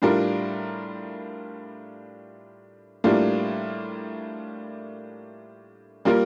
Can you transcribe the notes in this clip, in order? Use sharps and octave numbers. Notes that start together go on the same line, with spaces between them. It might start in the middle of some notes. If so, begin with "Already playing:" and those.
A2 G3 D4 F4 A#4
A2 G3 A#3 D4 F4
G3 A#3 F4 A#4